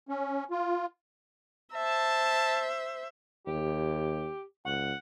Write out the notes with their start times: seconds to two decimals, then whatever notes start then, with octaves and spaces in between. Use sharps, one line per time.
0.09 C#4
0.51 F4
1.73 C5 E5 A5
3.47 D#2 G4
4.65 C#2 F#5